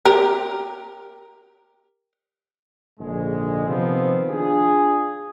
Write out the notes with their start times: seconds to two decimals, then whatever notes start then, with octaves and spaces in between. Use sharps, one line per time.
0.05 G4 A#4
3.00 A#1 G#2 D3 G#3
3.66 C3 D#3 F3 B3 C4
4.30 D4 F4 G#4